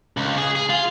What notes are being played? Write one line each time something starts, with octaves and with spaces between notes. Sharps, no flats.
C#2
G#4
G#4
F4